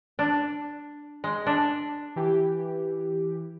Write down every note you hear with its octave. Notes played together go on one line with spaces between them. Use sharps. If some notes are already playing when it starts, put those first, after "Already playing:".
D4
G#3
D4
E3 G4